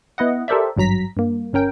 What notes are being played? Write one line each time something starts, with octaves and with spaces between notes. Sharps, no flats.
B3 E4 D#5 F#5
G4 A4 A#4 C5 D5 E5
G#1 G2 F#3 A#5 B6
G2 A#3
G1 C#4 A#4 G5